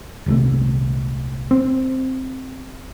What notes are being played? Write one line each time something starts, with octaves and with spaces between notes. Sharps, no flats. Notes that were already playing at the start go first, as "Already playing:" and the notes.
D#1 C2 A3
C4